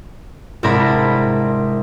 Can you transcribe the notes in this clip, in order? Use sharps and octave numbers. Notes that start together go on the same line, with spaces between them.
C2 G#2 D4 A#4 A#5 B5